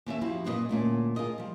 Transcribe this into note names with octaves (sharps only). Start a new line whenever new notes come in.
D#2 C#4 E5
F2 F3 E4 F#4 G4 F5
F#2 A#2 D#4 F#4 B4 D#5
D2 A#2 A#3 C#4
F4 G#4 A#4 D#5
F3 G3